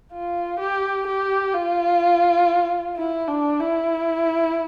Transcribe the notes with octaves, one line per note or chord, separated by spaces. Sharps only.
F4
G4
G4
F4
E4
D4
E4